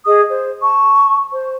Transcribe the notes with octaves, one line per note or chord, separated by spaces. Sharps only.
G#4 D#5 D#6
C5
A5 C#6
C5